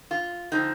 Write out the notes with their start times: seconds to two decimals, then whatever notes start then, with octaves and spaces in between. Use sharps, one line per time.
0.11 F4
0.52 D3 F3 C4 D#4